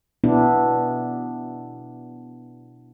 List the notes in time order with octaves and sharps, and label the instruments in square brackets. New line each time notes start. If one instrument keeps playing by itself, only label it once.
[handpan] B2 B3 D4 E4